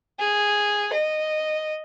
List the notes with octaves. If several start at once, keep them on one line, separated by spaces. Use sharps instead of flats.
G#4
D#5